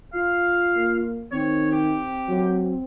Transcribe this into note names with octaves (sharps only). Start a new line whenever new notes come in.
F4 F5
A#3
D#3 C4 C#5
G4
F#3